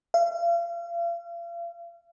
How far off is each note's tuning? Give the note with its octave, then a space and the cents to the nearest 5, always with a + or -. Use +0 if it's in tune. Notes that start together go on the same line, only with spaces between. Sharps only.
F5 -40